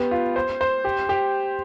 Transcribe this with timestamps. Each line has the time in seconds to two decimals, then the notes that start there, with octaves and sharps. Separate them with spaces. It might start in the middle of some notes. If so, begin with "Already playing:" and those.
Already playing: B3 G4
0.11 F4
0.36 C5
0.61 C5
0.85 G4
1.09 G4